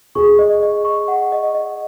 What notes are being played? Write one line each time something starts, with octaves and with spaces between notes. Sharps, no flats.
G#4 C#6
D#5
D#5
C#6
F#5
D#5
D#5